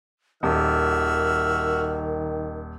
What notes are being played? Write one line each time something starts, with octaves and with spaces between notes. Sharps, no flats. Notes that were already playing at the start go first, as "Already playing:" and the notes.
D#1 D#3 F#4 A#4 E5 F6